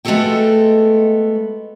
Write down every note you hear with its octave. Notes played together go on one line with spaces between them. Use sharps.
G#3 A3 B3 F#4 A4 G5